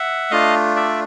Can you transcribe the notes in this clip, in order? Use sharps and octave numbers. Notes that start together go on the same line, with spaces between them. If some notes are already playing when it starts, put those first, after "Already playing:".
Already playing: E5 F#5
A3 D4 F4 D#5 F5
D5 E5